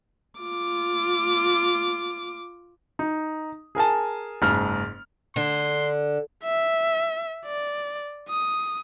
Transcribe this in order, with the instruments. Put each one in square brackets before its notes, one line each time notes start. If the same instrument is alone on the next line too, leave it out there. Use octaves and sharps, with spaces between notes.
[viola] F4 D6
[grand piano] D#4
G#4 A#4 G#5 A5
F#1 G#2 F6
[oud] D3 [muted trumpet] C6
[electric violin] E5
D5
D#6